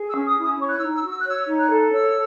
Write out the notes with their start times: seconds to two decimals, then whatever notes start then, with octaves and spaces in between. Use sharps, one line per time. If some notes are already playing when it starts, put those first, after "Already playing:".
Already playing: G#4
0.10 E6
0.15 C#4
0.27 D#6
0.38 E4
0.43 D#6
0.60 C#5 C#6
0.69 F#6
0.77 E6
0.82 D#4
0.93 E6
1.04 F#4
1.09 E6
1.18 F#6
1.26 C#5 E6
1.48 D#4
1.59 F#6
1.70 A4
1.92 C#5 E6